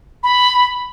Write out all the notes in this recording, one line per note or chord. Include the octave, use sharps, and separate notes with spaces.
B5